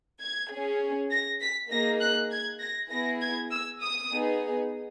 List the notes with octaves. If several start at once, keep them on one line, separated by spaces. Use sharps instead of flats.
G#6
C#4 G#4
A#6
B6
A#3 D#4 G#4 A#6
F#6
G#6
A#6
B3 E4 G#4 A#6
G#6
E6
D#6
B3 D#4 G#4